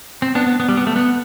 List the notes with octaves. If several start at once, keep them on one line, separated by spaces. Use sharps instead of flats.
C4
B3 D4
B3
B3
G3
B3
A3
B3